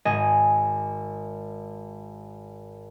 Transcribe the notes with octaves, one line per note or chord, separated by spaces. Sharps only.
G#1 D#5 G#5 E7